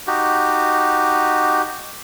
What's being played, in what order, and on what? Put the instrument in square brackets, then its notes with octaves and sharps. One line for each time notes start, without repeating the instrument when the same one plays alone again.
[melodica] D#4 F#4 G4